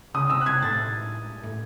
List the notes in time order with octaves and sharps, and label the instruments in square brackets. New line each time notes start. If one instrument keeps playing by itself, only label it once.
[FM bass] C#3 [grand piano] D#6
[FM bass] C3 [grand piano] E6
[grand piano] F#6
[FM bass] C3 [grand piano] G#6
[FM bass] A2 [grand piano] A6
[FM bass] A2